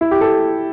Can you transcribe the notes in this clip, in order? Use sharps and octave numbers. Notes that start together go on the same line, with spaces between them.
E4
G4
A4